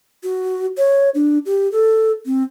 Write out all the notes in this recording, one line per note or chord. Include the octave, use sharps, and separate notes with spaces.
F#4
C#5
D4
G4
A4
C4